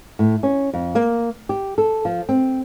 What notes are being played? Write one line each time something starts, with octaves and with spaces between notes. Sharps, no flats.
A2
C#4
F2
A#3
G4
A4
F3
C4